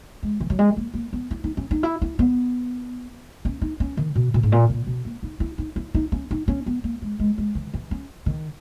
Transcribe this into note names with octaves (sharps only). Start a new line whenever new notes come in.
G#3
E3
F#3
G#3
A#3
A#3
B3
E4
D#4
C#4
D#4
E4
E4
B3
C#4
D#4
C#4
D#3
B2
B2
G#2
A#2
A#2
B2
A#3
D#4
E4
D#4
E4
D#4
C#4
D#4
C#4
B3
A#3
G#3
G#3
G#3
E3
E3
C#4
D#3